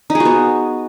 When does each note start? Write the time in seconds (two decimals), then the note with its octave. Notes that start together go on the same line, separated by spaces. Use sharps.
0.10 D#4
0.15 G#4
0.20 F#4
0.25 B3